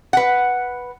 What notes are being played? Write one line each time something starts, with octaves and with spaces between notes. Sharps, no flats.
B4 F#5